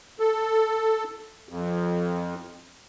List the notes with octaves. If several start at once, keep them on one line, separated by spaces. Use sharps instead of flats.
A4
F2